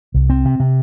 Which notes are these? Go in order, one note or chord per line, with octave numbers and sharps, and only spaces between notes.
C2
C4
C3
C3